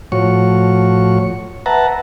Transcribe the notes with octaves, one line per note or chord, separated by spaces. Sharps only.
A2 F3 F#4 C#5 C#6
B4 E5 F#5 A5 A#5